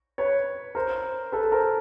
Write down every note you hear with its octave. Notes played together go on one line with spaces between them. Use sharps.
B4 C#5
A#4 C5
A4 B4
A#4 C5